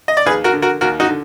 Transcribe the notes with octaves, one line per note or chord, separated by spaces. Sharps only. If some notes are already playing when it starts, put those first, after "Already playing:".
D#5
D5
D#2 G#4 B4
F#4 A#4
D3
F#4 A#4
D#2 F#4 A#4
D#4 F#4
D3